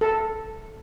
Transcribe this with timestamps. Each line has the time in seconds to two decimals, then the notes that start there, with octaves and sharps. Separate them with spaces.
0.01 A4